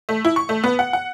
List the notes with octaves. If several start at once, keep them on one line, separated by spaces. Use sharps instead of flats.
A3
E4
C#6
A3
B3
F#5
F#5